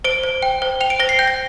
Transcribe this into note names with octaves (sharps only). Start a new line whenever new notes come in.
C5 D7
C5
G5
C5
G5 F7
D7
C5 A#6
C7
G5 G6
A#6